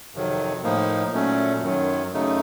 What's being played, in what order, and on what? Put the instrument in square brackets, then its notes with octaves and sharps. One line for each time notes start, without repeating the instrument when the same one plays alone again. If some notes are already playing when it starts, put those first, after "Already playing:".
[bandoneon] F2 C3 D#3 F#3
A2 F3 A#3 D#4
A#2 F#3 A3 C#4
F#2 D#3 F#3
F#2 C#3 A3 D#4